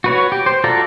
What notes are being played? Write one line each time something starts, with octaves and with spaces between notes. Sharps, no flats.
F#4 B4 C#5
G4
C5
F4 F#4 A4 D5 A#5